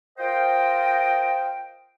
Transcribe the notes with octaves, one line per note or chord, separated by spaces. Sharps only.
F4 A#4 C5 D#5 G5